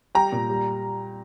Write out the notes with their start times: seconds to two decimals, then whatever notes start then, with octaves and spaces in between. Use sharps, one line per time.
0.15 G3 G5 A#5
0.32 A#2
0.50 G3